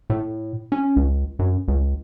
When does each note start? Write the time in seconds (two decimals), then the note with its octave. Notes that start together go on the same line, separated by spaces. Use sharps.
0.10 A2
0.72 C#4
0.96 C#2
1.39 F#2
1.68 C#2